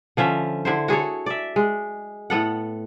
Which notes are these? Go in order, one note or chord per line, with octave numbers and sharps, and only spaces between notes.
D3 F3 C#4 E5
D3 E4 C5
F#4 G#4 A4 C#5
D5 E5
G#3
A2 B3 A4 F#5